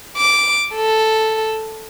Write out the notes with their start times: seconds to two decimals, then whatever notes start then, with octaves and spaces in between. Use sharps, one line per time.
0.17 D6
0.75 A4